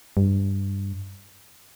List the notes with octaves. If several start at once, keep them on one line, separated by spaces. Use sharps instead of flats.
G2